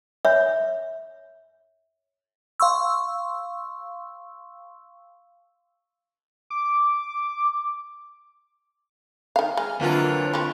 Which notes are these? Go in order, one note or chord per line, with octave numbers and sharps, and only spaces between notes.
C#5 E5
F5 C6 C#6 E6
D6
D#3 F5
G#3 F6
F2 D3 E3 F#3 A#3 F4
F3 C4 B5 C#6